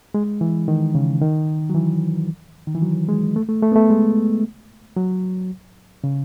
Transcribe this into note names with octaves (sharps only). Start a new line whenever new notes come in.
G#3
E3
D#3
C#3
D#3
F#3
E3
D#3
E3
F#3
G#3
A3
A3
A3
B3
A3
G#3
F#3
C#3